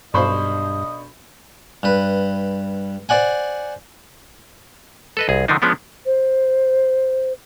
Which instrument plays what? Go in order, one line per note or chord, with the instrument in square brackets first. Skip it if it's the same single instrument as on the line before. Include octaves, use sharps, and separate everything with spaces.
[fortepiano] B1 C5 [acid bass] G2 [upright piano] D4 B5 C#6 [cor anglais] D#5
[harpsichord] G2 B4
C5 D5 F#5 G#5
[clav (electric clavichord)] A4 B4 D#5
C2 G#4
D3 D#3 F3 D4 D#4
F3 G#3 B3 C#4 D4
[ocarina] C5